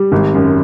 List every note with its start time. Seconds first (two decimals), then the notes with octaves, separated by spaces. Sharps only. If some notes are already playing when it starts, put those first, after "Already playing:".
Already playing: G3
0.12 G#1
0.34 F#2